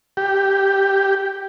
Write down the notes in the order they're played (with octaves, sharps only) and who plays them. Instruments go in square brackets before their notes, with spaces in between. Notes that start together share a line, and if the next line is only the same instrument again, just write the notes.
[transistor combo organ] G4